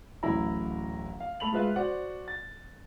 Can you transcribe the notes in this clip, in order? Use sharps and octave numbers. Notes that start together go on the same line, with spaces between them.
D1 A1 E4 A#5
F5
A3 B5 F7 F#7
G#3 F4 B4 E5 F5
F#4 C5 D5 F#5
A6